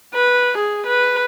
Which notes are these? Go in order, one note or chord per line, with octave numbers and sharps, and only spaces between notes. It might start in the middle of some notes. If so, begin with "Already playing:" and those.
B4
G#4
B4